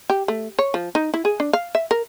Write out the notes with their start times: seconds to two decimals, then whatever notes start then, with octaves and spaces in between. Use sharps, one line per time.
0.10 G4
0.28 A3
0.59 C#5
0.74 F3
0.95 D#4
1.14 E4
1.25 G#4
1.40 D4
1.53 F5
1.75 E5
1.91 A#4